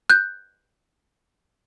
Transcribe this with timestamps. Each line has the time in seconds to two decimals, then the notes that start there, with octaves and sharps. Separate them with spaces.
0.10 F#6 G6